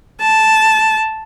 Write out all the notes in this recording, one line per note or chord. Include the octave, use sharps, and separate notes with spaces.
A5